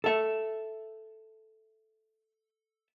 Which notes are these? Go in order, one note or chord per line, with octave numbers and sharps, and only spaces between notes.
A4 E5